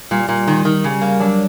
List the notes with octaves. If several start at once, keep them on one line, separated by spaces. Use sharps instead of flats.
A#2 G3
A#2
D#3
D#3
C#3 G3
A#3
F#3 D4